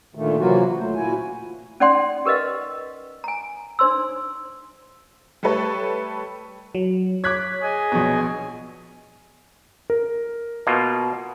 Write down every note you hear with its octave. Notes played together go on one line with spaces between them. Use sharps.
A#2 D3 D#3 A3
C3 E3 F#3 A#3 F4 F#4
D2 A3 C5
A#2 E4 F#4 G#5
C#4 D#4 D5 F#5 G5 C6
G4 A#4 B4 D#5 F5
G#5 A#5
D4 D#4 C5 C6 E6
G3 A3 A4 B4 C#5
F#3
C#5 D6 F#6 G#6 B6
G#4 D#5 G#5
A#1 B2
A#4
B2 A#3 F4